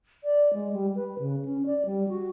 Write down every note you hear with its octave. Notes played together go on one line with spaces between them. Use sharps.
D5
G#3
G3
B4
C#3
C#4
D5
G3
F#4